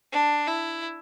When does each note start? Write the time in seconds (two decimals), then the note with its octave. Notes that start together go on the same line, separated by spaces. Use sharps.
0.12 D4
0.48 E4